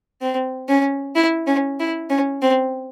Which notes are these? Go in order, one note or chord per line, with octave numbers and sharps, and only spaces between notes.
C4
C#4
E4
C#4
E4
C#4
C4